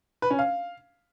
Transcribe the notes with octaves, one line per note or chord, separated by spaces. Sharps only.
B4
C#4
F5